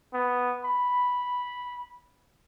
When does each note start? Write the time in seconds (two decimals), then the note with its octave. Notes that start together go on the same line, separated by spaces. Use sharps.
0.14 B3
0.65 B5